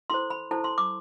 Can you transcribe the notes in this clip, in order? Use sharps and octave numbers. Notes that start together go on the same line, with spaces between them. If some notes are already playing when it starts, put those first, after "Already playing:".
E4 A4 C5 C6
B5
E4 A4 C5 A5
C6
D6